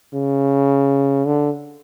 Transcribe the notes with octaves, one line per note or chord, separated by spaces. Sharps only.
C#3
D3